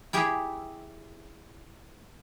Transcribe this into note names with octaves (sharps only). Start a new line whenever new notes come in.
E4 G4 G#4 E5